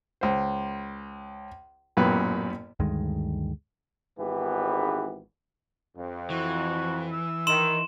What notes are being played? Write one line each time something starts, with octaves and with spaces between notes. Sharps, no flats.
C#2 C5
A1 F#2 A#2 B3 B4 G5
D2 G2 D#3 G#3
G#1 G#2 E3 B3 G4
F2
E3 F#4
E6
D#3 C6 E7